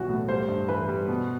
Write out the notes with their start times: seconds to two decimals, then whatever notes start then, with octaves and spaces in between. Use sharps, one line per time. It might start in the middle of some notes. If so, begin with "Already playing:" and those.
Already playing: B1 E3 G3 F#4
0.09 A2
0.29 G3 C5
0.48 G2
0.69 E3 B4
0.88 G3
1.08 B2